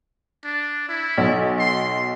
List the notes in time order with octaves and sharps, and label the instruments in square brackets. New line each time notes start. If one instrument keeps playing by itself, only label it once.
[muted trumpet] D4
E4
[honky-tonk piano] B1
[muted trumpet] C6